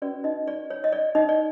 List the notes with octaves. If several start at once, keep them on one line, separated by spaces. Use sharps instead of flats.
C#4 F#4 B4 D5
D#4 D#5
D5
C#5
D#5
D5
D#4 D#5
D5